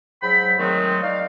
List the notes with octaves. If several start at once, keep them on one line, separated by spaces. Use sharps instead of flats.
G#2 F#3 G5 B5
D#3 F#3 G#3 A3 C4
D#4 D5 F5